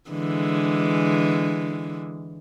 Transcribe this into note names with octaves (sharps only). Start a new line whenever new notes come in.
D3 E3 G#3